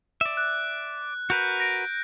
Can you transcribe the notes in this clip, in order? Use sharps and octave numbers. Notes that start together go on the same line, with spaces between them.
D5 E5
F#6
F#4 A#4 B4 F#6 G6
A#6 D7